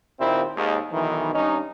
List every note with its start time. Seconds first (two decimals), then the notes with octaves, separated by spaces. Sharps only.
0.19 D#2 A#2 C4 E4
0.56 D#2 G#2
0.92 B1 D#3 E3
1.34 G2 C#4 D#4